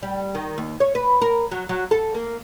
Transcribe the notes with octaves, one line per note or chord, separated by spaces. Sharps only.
G3
D#3
D#2
C#5
B4
A#4
F#3
F#3
A4
A#3